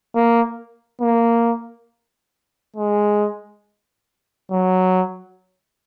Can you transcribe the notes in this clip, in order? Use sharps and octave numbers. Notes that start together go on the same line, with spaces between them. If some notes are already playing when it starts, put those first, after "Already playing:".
A#3
A#3
G#3
F#3